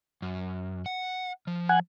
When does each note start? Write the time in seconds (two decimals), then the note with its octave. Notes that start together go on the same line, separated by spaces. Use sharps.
0.22 F#2
0.86 F#5
1.47 F3
1.69 F#5 G#5